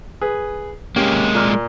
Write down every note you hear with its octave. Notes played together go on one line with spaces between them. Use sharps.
G#4 B4
G#3 A#3 C#4 G4
A#2 F6